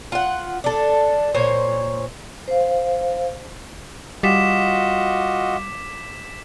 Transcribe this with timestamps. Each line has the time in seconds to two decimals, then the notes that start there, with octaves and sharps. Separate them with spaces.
0.12 F4 F#5
0.64 D4 A4
1.35 A#2 C5 C#5
2.48 C5 F5
4.23 G3 F4 F#4 D#5 D6 B6 E7